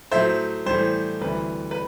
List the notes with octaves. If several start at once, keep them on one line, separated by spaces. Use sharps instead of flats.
A2 F#3 C5 E5
A2 E3 G3 C5
D2 C3 E3 G3 B4
B4